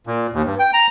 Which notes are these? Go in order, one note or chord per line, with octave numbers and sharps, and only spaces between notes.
A#2
D#2
G2
G5
A#5